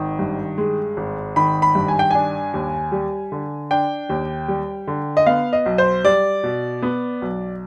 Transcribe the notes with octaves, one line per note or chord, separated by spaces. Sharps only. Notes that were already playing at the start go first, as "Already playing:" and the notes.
Already playing: G#1 D#3
G2
G#3
G#1
D#3 B5
B5
G2
G#5
G5
D4 G#5
D#2
G3
D3
D4 G5
D#2
G3
D3
D#5
B3 F5
D#5
B1
C5
G3 D5
B2
B3
B1